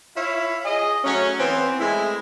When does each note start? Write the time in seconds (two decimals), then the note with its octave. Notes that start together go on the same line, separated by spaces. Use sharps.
0.16 E4 F4 C#5 E5 F5
0.65 G#4 D#5
1.04 F#3 A3 C#4
1.39 E3 B3 C4
1.80 G#3 A3 E4